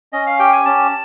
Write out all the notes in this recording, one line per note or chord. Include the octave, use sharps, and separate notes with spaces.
C#4 D#5
F5
G4 G5
G#5
C#4 A5